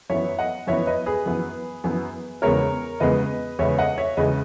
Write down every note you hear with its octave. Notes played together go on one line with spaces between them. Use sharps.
F#2 E3 B3 C#5 E5
D#5 F#5
F#2 E3 B3 C#5 E5
B4 D#5
G#4 B4
F#2 E3 B3
F#2 E3 B3
E2 C#3 G#3 B3 A#4 C#5
E2 C#3 G#3 B3 B4 D#5
E2 C#3 G#3 B3 C#5 E5
D#5 F#5
C#5 E5
E2 C#3 G#3 B3 B4 D#5